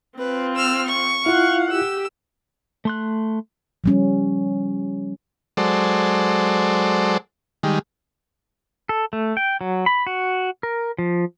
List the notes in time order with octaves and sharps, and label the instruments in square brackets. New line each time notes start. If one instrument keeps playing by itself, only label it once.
[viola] C4 F4 [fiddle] B4
[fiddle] E6 F6
C#6
[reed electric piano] E4 F4 [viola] F5 F#5
[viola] G4 [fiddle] E6
[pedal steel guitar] A3 C6 F#6
[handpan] F3 G3 C#4
[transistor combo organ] F#3 G#3 A4 C5 D5
D#3 G3 G#3
[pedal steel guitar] A4
A3
G5
F#3
B5
F#4
A#4
F3